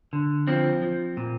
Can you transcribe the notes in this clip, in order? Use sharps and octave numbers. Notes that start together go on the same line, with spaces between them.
D3
F3 C4
F3
A#2